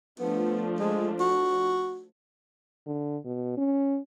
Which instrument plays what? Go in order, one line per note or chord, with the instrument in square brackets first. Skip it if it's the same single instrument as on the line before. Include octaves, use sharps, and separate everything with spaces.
[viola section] F3 A3 D4 [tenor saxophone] B3
[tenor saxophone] G#3
F#4
[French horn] D3
B2
C#4